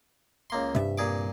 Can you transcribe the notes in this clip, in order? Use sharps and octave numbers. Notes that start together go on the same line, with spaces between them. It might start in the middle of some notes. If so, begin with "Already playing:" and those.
C#2 A#3 C6
C2 G2 E5
A#2 G#4 D6